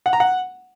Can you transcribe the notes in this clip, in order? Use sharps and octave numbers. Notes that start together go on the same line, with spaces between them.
F#5
A#5
F#5